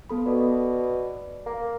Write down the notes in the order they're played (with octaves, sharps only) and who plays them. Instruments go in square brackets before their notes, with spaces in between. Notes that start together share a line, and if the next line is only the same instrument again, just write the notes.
[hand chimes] B3 A4 B5
[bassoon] B2 [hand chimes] D5
[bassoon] A#3